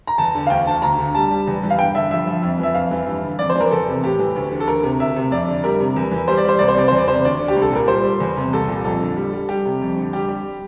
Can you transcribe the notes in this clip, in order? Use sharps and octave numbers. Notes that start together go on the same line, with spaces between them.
A#5
E2 A5
D3
F5
D2 G5
D3 A5
D2 A#5
D3
G3 A5
G3
E2
E3
F5
G2 G5
D3 E5
F3 E5
F3
F2
E3 E5
F2 F5
E3
G2
D3
F2 D5
C5
E3
A#4
E2 A4
C3
A2 G4
E3
D2
D3
A4
D2 A#4
C3
D2 E5
C3
F2 D5
D3
G3 A#4
C3
E2
E3
G3 C5
D5
G3 C5
C2 D5
C5
C3 D5
E2 C5
D5
C3 C5
D2 D5
D3
G4
C2
A4
A#2 A#4
G3 C5
G3
E2
C3
C2 A4
A#2
F2 A4
D3
G3
G3
G3 G4
C3
F2
D3
G3 G4
G3